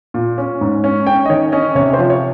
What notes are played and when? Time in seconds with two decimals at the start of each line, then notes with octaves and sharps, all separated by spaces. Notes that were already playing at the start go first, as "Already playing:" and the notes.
0.14 A#2
0.38 C#4
0.61 G#2
0.84 C#4
1.06 C#4 G5
1.26 D#5
1.29 D#3 C#5
1.52 C#4 D#5
1.75 C3 C#5
1.94 C5
1.99 F3
2.10 C#5